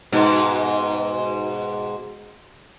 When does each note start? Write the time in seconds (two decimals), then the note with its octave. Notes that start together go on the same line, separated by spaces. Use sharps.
0.12 G#2 B2